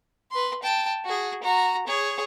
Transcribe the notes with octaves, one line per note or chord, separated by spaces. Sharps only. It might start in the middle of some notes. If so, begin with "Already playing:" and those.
B4 C6
G5 A5
F#4 G#4
F#4 A#5
G#4 C#5